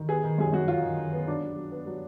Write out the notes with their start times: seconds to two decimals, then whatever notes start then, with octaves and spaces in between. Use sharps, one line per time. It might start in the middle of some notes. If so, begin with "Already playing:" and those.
Already playing: D#3
0.09 B3 G#4
0.24 D#3
0.38 F#2 G#4
0.52 F#2 F#4
0.68 F#3 F4
0.83 D#3
0.97 D#3
1.13 B3
1.28 F#3 D4
1.41 F#3
1.56 F#3
1.72 B3
1.86 F#3